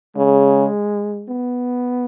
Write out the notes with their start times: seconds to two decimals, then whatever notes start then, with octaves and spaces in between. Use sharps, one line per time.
0.17 C#3 G#3
1.27 B3